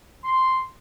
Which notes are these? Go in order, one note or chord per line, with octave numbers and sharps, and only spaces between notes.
C6